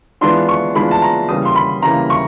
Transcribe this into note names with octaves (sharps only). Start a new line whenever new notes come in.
E3 G#3 B3 D4 F4 C6
C#6
E3 G#3 B3 D4 F4 B5
A5
A#5
C#3 E3 G3 A#3 D#6
C6
B5
C#3 E3 G3 A#3 A#5
C#6